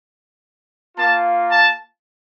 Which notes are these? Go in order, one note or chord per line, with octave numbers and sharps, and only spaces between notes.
A#3 F4 A5
A5